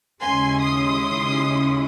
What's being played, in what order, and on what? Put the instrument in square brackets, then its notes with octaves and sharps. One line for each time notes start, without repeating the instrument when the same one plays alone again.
[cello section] D#2 C#3 G#3 C#4 E4 [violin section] G#5 C6
[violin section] C6 D#6